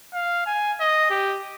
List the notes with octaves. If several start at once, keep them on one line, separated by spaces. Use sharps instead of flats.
F5
G#5
D#5
G4